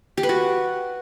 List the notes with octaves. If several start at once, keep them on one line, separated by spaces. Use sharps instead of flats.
G4
B4
F#4